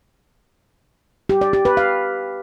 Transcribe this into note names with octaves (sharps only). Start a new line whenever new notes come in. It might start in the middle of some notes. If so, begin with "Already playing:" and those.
G4
D5
G4
B4
F5